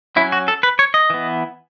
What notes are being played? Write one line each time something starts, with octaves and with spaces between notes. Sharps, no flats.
F#3 C#4 E4
F#4
A4
B4
C#5
D#5
E3 B3